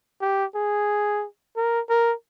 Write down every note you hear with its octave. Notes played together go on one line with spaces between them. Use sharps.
G4
G#4
A#4
A#4